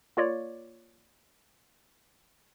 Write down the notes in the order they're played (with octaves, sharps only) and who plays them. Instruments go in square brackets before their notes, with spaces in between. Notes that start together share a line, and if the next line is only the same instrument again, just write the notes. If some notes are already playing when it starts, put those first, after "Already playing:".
[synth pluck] A#3 F4 C#5 D5